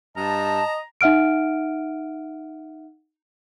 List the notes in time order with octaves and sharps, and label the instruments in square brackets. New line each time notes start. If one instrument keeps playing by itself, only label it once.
[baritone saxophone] G2 [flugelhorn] D#5 [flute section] A5 [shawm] A#5
[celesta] D#4 E5 F#5 F6 D7